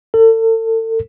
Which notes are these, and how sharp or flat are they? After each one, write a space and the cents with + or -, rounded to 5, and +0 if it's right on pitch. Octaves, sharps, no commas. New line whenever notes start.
A4 +35